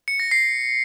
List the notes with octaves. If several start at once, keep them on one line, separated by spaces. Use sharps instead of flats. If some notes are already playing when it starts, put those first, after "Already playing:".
C#7
A#6
C7